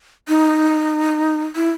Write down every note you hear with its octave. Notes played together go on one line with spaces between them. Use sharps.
D#4
E4